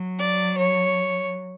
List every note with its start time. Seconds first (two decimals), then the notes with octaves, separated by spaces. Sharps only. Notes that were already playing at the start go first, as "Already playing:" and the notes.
Already playing: F#3
0.19 D5
0.58 C#5